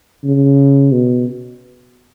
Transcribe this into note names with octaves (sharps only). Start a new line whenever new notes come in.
C#3
B2